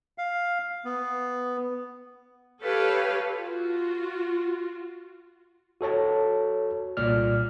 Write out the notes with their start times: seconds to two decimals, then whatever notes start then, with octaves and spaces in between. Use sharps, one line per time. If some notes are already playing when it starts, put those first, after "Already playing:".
0.18 F5
0.85 B3
2.62 G4 A4 B4 C#5 F5
3.34 F4 F#4
5.81 F#4 A4 C#5 A5
6.97 C2 A#2 D5 F6